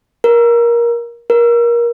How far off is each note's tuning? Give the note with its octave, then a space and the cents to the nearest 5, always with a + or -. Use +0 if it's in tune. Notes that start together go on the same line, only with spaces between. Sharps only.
A#4 +20
A#4 +25